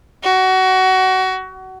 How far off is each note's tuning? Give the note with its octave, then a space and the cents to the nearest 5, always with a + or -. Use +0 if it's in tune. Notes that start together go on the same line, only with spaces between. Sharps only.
F#4 +25